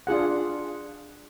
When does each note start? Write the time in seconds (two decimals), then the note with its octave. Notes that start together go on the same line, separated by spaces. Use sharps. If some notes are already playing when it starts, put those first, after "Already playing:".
0.07 D4 F4 G#4 F#5